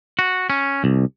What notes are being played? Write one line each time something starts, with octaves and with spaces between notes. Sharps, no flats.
F#4
C#4
C2